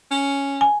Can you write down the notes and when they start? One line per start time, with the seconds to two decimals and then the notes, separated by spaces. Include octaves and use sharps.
0.11 C#4
0.61 G#5